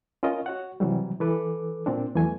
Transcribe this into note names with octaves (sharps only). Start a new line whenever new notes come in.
C#4 F4 A#4 D#5
F#4 C#5 F#5
C3 E3 F#3 G3
E3 A4 B4 D6
A#2 C4 D4
E2 E3 F#3 A3 G#5